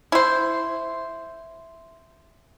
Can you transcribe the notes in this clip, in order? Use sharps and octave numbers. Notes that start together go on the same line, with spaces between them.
E4 C5